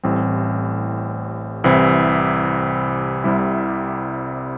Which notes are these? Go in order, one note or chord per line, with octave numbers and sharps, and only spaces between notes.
A1 A2 G3 C4
C2 C3 E3 C4 E4
C2 C3 G3 E4